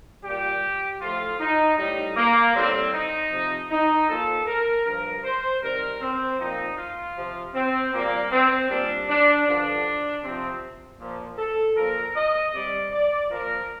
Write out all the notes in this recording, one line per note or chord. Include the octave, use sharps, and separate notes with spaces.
A#2 G3 G4
A2 F3 F4
D#4
A2 G3 D#4
A#3
A2 G3 C4
D#4
C3 F3
D#4
A#2 F3 A4
A#4
G2 F3 A#4
C5
C3 D#3 G3 A#4
C4
A#2 F3 D#4
F4
C3 F3
C4
A#2 G3 A#3
C4
A#2 G3 D4
D4
G2 D3 F3 D4
C3 F3 C4
A#2 F3
A4
A#2 F3 A#4
D#5
C3 G3 D5
D5
A#2 F3 A#4